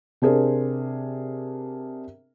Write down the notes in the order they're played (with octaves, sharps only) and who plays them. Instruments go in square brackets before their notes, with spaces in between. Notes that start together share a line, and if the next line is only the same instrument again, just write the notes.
[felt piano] C3 D4 G#4 A#4 C5